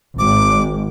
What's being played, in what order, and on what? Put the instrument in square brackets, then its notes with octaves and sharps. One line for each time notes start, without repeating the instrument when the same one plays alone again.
[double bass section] G#1 [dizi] D6